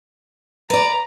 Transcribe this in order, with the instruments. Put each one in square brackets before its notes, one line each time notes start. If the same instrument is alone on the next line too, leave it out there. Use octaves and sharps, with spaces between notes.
[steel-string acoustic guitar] B4 D5 [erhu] A#5